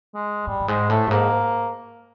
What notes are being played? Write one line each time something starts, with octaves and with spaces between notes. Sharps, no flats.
G#3
G#2 G3
G2
G#2 G#3
A2 A3
G2
G#2 A#3